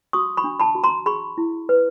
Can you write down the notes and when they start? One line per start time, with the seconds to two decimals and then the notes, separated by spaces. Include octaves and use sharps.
0.13 F#4 C#6 D#6
0.37 B5 C#6
0.44 D4
0.60 A5 B5
0.75 F#4
0.84 A#5 C6
1.06 G#4 B5 C#6
1.38 E4
1.69 B4